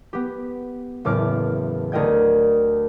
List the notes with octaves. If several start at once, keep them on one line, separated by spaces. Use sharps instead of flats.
B3 G4
F#1 E2 A2 D6 F6
D2 A#4 D#5 G5 G#6